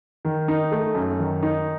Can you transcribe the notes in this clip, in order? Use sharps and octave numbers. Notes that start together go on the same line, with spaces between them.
D#3
D#4
A3
F#2
D#3
D#4